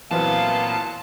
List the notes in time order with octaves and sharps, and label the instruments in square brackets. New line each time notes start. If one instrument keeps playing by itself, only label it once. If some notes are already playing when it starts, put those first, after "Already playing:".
[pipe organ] A#2 B3 F4 [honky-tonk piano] E3 F#3 C4 [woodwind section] F5 [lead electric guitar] A5